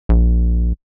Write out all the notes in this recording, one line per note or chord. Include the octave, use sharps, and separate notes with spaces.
A#1